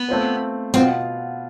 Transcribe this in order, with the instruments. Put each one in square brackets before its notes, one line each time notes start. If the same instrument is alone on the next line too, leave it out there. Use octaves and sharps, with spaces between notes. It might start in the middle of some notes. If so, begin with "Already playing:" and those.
Already playing: [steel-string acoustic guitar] B3
[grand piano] A3 C4 F4 B4
[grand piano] B2 B3 F4 [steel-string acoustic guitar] C4